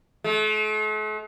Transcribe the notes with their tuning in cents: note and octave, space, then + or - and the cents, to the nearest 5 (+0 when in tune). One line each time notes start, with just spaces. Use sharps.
A3 -45